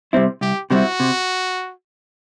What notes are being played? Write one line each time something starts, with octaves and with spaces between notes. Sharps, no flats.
C3 G3 C4 E4
C2 G4
C3 G3 C4 E4 F#4
C3